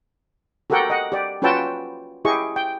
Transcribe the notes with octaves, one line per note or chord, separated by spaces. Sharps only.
F#4 G4 A4 A#4 F#5 G5
D#5 F#5
G4 D5
C#4 F4 F#4 B4 G5 A5
E4 G4 G#4 D#5 C#6
G5